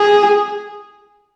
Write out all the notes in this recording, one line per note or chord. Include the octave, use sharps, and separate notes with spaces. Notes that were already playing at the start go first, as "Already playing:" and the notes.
Already playing: G#4